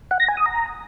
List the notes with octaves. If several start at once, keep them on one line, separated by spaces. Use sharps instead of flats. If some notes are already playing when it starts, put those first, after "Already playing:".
F#5
A#6
G#5
D#6
A#5